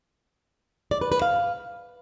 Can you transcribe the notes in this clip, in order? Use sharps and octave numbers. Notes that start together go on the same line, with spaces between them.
D5
B4
B4
F5